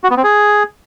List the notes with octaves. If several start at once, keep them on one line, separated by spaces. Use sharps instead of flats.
F#4
B3
C4
G#4